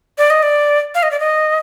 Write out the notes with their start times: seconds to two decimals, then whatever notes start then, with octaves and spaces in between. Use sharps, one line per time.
0.18 D5
0.30 D#5
0.43 D5
0.95 F5
1.03 D#5
1.11 D5
1.20 D#5